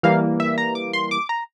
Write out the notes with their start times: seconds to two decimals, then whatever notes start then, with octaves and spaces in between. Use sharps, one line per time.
0.03 E3 G3 A#3 F5
0.40 E5
0.58 A#5
0.75 D6
0.93 C6
1.11 D6
1.29 A#5